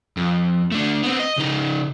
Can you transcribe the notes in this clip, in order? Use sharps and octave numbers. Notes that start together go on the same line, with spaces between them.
F2
A3 D4
B3 C4
D#5
C#3 D#4